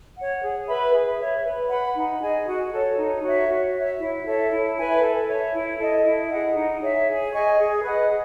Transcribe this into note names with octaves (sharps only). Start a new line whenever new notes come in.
C#5 F#5
G#4
B4 E5 B5
G#4
C#5 E5
B4
F#5 B5
D#4
G#4 D#5 G#5
F#4
A4 C#5
D#4
F#4 C#5 E5
F#4
C#5 E5
E4
A4 C#5 E5
E4
B4 E5 G#5
A4
C#5 E5
E4
A4 D#5
E4
G#4 D#5 F#5
D#4
G#4 C#5 E5
G#4
D#5 G#5 C#6
G#4
B4 D#5 F#5
G#4